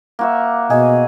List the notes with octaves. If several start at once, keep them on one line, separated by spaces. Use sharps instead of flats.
A#3 F#4 E5
B2 G#4 D#5